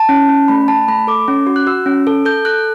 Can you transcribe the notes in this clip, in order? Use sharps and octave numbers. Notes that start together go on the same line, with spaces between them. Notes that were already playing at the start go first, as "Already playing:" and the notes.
Already playing: A5
C#4
C#4
A3 B5
A3 A5
A3 B5
A4 D6
C#4
F#4
F#6
F#4 E6
C#4
A4
A4 G6
A4 F#6